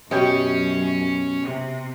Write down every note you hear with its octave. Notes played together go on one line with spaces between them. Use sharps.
F#2 B2 C#4 G4 C#5 G5
C3